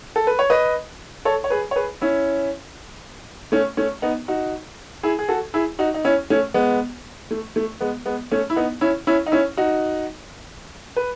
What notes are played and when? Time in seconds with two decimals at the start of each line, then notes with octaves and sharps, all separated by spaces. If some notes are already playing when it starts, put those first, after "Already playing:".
0.16 A4
0.27 B4
0.39 C#5
0.50 B4 D#5
1.25 A4 C#5
1.44 C#5
1.50 G#4 B4
1.71 C#5
1.76 G#4 B4
2.01 C#4 E4
3.52 A3 C#4
3.77 A3 C#4
4.02 B3 D#4
4.28 D#4 F#4
5.03 E4 G#4
5.19 G#4
5.29 F#4 A4
5.54 E4 G#4
5.79 D#4 F#4
5.94 D#4
6.04 C#4 E4
6.30 A3 C#4
6.54 G#3 B3
7.31 A3
7.56 A3
7.81 G#3 B3
8.06 G#3 B3
8.31 A3 C#4
8.50 E4
8.56 B3 D#4
8.81 C#4 E4
9.07 C#4 E4
9.26 D#4
9.32 C#4 E4
9.57 D#4 F#4
10.96 B4